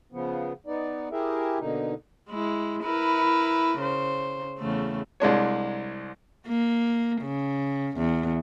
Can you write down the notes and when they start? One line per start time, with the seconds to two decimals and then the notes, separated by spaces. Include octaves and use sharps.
0.12 C#3 F3 B3
0.67 B3 D#4 D5
1.11 E4 G4 G#4 A#4 E5
1.59 B2 D3 A#3 D#4
2.29 G#3 E4
2.83 E4 A#4 B4
3.79 C#3 C5
4.59 E2 C#3 A3
5.20 C2 G#3 D4 C#5
6.46 A#3
7.21 C#3
7.97 E2